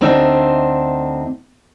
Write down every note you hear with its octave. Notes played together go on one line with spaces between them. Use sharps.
D2 C4 D4 D#4 E5